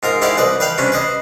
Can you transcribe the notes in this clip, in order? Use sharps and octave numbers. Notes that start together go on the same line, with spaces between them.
G#2 F4 A#4 D#6
G#2 E4 G4 D5 F5 D#6
C2 B4 D5 D#5
B4 D5 F5 G5 C6
C3 G3 C#4 D4
B4 C5 D#5